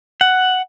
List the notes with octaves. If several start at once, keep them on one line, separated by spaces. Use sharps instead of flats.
F#5